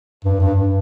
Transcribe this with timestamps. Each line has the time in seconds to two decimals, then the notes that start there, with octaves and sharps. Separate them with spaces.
0.25 G2
0.40 G2